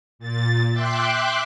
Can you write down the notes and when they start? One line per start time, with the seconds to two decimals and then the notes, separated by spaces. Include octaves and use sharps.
0.19 A#2 A6
0.73 E5 G5 C6 D6 F#6